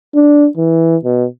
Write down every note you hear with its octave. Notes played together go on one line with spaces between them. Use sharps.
D4
E3
B2